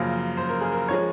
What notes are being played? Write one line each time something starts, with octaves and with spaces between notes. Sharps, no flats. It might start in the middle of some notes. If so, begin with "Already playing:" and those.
Already playing: F#2 C#3 F3 A#3
C5
A#4
G#4
A#4
F3 G#3 C#5